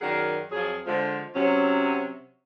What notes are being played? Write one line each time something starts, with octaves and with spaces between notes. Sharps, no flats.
F#2 D#3 G#4 A#4 D5 F#5
F2 F3 F#3 G#4
D3 F3 G#3
C3 F#3 C#4